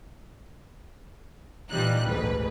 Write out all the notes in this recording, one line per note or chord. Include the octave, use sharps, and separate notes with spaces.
A#2 E3 F3 G3 D#4 F#6
A1 D2 G#2 B4